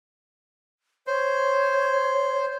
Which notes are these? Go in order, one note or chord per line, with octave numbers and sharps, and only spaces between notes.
C5 C#5